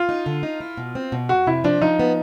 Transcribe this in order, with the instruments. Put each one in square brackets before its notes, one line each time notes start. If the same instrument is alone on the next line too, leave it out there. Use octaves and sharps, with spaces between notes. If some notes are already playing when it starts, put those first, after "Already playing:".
Already playing: [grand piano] F4
[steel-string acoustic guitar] D#4
D3
D#4
E4
B2
C4
B2
[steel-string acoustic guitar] F2 [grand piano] F#4
[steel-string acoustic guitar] C3 [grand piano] E4
[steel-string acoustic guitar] F3 [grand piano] D4
[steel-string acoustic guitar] F3 [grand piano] D#4
[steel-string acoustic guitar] B3